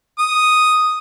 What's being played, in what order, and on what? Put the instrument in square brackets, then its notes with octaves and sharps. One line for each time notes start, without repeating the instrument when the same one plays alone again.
[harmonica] D#6